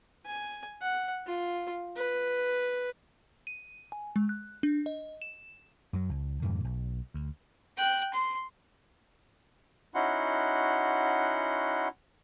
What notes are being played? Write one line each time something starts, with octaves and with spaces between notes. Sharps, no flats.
G#5
F#5
F4
B4
D#7
G#5
G#3
F#6
D4
D#5
E7
F#2 F#3
C#2
F2 G#2 B2 D#3
B1
D2
G5 F#6
C6
C#4 D#4 E4 F#4 F#5 C6